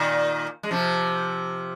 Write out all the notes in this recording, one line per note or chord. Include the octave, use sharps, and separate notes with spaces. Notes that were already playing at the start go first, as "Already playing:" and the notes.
Already playing: A#2 D#3
G#3
C3 F3